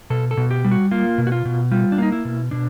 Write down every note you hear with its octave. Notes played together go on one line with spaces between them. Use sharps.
B2 A4
A4
B2
G4
G3
F#4
A#3 F4
B2
F#4
F4
B2
G3 F4
D4
A#3 D#4
E4
B2
B2 D4